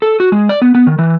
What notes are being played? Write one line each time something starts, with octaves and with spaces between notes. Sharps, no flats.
A4
F#4
G#3
D5
B3
B3
D#3
E3